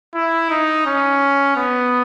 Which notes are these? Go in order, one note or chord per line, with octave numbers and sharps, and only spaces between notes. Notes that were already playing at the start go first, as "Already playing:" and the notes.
E4
D#4
C#4
B3